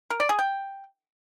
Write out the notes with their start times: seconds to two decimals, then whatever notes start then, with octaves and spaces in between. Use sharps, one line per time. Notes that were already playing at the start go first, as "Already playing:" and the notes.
0.10 A#4
0.20 D5
0.29 G#4
0.39 G5